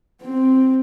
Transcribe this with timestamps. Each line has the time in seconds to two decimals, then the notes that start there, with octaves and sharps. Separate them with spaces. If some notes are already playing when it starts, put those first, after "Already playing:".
0.22 C4